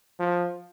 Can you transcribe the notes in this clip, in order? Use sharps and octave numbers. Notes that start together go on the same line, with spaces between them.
F3